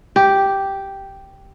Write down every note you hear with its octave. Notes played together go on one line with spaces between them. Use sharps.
G4